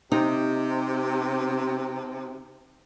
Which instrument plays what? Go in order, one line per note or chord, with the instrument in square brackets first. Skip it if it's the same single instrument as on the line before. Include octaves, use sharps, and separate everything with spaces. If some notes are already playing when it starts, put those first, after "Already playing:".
[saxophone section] C3 [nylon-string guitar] D#4